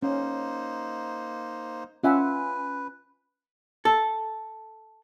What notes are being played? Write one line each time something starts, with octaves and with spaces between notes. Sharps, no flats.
A#3 C#4 D#4 C5
C#4 F4 B4 E5 F#5 G#5
A4